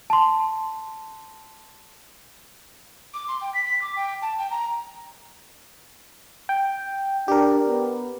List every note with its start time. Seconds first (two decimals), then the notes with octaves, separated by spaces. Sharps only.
0.10 A5 C6
3.13 D6
3.28 C6
3.41 G5
3.54 B6
3.65 B6
3.81 D6
3.96 G5
4.22 A5
4.38 G5
4.50 A#5
6.49 G5
7.28 D4 G4 A#4
7.68 B3